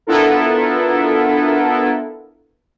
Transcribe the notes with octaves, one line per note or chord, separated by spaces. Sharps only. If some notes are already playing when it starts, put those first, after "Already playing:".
B3 D4 E4 F4 A4 A#4